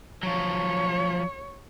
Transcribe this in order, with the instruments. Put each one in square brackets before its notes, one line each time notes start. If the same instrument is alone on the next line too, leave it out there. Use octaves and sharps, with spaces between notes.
[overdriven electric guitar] F3 F#3 [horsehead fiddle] C#5